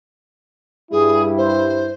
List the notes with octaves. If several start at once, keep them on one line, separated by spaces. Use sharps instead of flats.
G2 G3 E4 G#4
C5